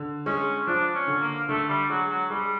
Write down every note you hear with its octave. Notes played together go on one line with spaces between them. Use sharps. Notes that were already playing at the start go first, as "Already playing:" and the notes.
Already playing: D3
G#3 C#4
F3 D4
C#4
D3
A#3
D3 A3
G3
F#3 G#3
F#3
G3 G#3